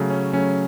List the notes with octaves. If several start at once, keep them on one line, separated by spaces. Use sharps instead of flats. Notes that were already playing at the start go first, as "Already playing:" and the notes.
Already playing: C#3 F#3 A3
C#4
C#3 F#3 A3 C#4